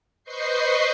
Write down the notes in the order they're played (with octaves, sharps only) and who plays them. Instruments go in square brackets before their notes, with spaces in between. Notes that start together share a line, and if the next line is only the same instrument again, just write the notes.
[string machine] B4 C5 D#5 C#6 G6 C7